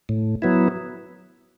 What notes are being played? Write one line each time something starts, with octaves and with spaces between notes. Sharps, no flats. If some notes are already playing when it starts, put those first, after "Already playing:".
A2
F#3 B3 E4